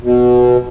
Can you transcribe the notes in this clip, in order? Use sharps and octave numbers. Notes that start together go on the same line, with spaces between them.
B2